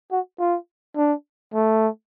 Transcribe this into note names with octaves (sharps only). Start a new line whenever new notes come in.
F#4
F4
D4
A3